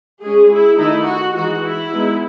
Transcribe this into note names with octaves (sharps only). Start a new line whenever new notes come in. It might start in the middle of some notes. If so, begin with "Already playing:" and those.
G#3 C#4 G#4
E4
D#3 A3 D#4 E4
F#4
E3 G#3 D#4 F#4
E4
G#3 B3 D#4